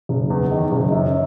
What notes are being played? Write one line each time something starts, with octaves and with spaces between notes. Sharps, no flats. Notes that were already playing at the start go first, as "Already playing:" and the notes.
F#1
E2
D#3
F#1
F#2